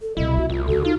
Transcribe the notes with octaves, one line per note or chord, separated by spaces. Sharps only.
A4
C2 B2 E4 D#5
A3 F#4
C2 F4
D2 C#3 F#4 A4
D#4 F4